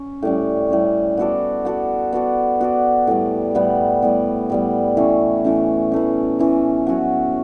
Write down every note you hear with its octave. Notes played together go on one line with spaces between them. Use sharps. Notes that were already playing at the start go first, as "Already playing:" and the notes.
Already playing: C#4
A2 G3 C#4
A2 G3 C#4
B3 F#4 A4 D5
B3 F#4 A4 D5
B3 F#4 A4 D5
B3 F#4 A4 D5
A2 G3 B3
A2 G3 B3
A2 G3 B3
A2 G3 B3
E3 A3 C#4
E3 A3 C#4
E3 A3 C#4
E3 A3 C#4
F#3 C#4 F#4 C#5